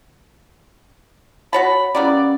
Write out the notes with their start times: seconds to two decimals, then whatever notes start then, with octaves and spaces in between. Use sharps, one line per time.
1.53 F#4 C#5 A5 B5
1.95 G3 A#3 B3 C#4 E4 D5